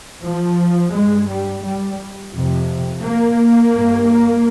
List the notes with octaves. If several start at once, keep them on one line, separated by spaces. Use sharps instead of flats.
F3
G2 G#3
G3
G3
F2 C3
A#3
G2